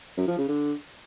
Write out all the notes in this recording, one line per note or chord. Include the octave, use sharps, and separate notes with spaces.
F#2
F3
C#3
D3